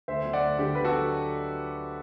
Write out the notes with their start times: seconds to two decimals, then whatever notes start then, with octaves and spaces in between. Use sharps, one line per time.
0.08 D2 C5 E5
0.25 F#3
0.33 D5 F#5
0.42 D2
0.59 D3 G4
0.75 D2 B4
0.85 F#4 A4
0.92 F#3